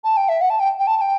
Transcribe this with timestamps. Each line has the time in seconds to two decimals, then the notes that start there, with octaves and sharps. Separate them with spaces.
0.04 A5
0.17 G5
0.29 E5
0.41 F#5
0.50 A5
0.60 G5
0.79 G5
0.87 A5
0.97 A5
1.01 G5